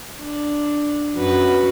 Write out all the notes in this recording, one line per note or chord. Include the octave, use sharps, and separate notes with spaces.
D4
F#2 F#4 B4